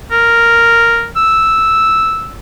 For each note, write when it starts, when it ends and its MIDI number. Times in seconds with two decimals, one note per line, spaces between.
0.11 1.06 70
1.16 2.34 88